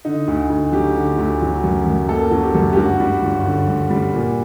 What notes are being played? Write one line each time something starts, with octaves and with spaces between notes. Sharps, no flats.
D3 D#4
D2
D2
F#3 G4
D3
D2
F#3
F#2
F#2
A#3 A4
F#3
G4
F#2
G4
G2 F#4
G3
G1
D3
G2
G3
A#2